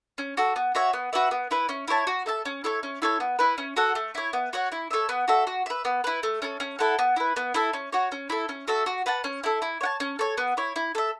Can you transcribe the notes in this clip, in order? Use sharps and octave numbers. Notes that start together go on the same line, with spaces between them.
C#4
F#4 A4
B3
F#4 C#5 E5
B3
F#4 B4 E5
B3
E4 B4
C#4
E4 C#5 A5
F#4
A4 E5 A5
C#4
E4 A4 C#5
C#4
E4 A4 C#5
B3
E4 B4
C#4
F#4 A4 F#5
A3
E4 C#5
B3
F#4 C#5 F#5
E4
A4 C#5 E5
B3
F#4 A4 E5
F#4
B4 E5
B3
E4 B4
A3
C#4 A4
C#4
E4 A4 F#5
B3
E4 B4
B3
E4 A4
C#4
F#4 C#5
C#4
E4 A4
C#4
F#4 A4 E5
F#4
B4 F#5 A5
C#4
E4 A4
E4
C#5 F#5 A5
C#4
A4 C#5
B3
E4 C#5
E4
A4 E5